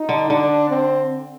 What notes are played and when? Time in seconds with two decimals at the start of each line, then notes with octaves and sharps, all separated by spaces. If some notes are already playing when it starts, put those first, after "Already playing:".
Already playing: D#4
0.09 D3
0.30 D3 D4
0.69 C4